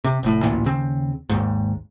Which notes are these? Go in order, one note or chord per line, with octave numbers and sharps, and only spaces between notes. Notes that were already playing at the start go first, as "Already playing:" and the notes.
C3
F1 A2
A1 D2 A#2 E3
D#2 C#3 C4
G#1 D#2 G#2